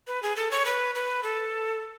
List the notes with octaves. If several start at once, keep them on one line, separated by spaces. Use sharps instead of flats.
B4
G#4
A4
C#5
B4
B4
A4